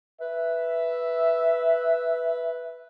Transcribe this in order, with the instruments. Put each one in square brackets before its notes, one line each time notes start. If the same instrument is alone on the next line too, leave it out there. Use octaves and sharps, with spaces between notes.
[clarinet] B4 [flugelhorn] E5